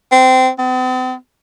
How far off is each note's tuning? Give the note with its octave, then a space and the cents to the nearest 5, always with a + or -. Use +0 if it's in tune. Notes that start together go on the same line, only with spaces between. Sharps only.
C4 -20
C4 -45